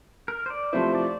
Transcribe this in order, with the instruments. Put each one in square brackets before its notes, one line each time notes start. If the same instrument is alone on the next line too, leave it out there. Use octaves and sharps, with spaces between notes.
[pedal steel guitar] A#4
C5
D5
[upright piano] C3 F3 A3 C4 E4 [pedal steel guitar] C5
[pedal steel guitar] D5